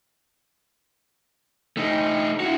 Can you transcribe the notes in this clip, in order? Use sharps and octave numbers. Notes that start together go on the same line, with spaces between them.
A3 D#4
E4 F#4